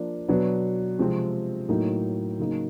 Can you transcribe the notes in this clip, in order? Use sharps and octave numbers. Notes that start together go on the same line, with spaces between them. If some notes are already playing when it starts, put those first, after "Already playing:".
Already playing: F3 A#3 D4
B2 F#3 B3 D4
C3 F3 G#3 C4
A2 F#3 A#3 D#4
C#3 F#3 A#3 D#4